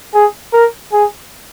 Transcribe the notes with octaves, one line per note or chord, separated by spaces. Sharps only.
G#4
A#4
G#4